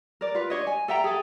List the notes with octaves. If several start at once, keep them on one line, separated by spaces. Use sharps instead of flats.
A#4 D5
F4 B4
D4 C#5 D#5
G#5
A4 E5 G5 A#5
G#4 A4 G#5